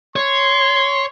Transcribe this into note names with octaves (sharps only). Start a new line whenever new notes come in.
C#5 C6